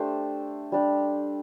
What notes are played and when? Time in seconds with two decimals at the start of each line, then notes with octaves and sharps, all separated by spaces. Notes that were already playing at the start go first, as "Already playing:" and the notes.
Already playing: A3 D4 G4 C5
0.72 G3 D4 G4